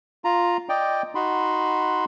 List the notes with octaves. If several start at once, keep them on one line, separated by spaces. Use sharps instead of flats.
F4 A#5
D5 D#5 G5
D#4 F#4 B5 C6